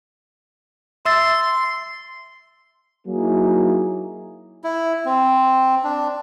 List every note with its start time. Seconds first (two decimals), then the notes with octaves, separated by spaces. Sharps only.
1.06 E5 C6 E6 A6
3.07 F#3 A#3 D#4 E4 G#4
4.64 E4
5.06 C4
5.84 D4